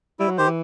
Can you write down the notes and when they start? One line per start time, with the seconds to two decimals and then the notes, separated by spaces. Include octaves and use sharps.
0.19 G3 E4
0.29 F#3
0.38 D#3 G4 C5
0.47 E3